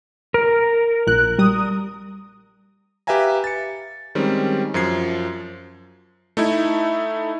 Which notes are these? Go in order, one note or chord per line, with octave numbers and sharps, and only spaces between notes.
A#4
A#1 F#6
G3 D#6
G4 B4 E5 F5 G#5 A#5
A6 C#7
D#3 G3 G#3 C4 C#4
F#2 F3 G#6 C7
A3 D#4 E4